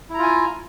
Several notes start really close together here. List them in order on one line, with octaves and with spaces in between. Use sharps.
E4 A#5 F4 G#5